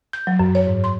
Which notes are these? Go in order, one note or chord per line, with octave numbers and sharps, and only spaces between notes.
G6
F#3
F#2
C#5
G#2
C6